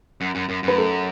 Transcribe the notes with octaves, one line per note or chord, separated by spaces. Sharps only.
F#2
F#2
F#2
F#2 B4
A4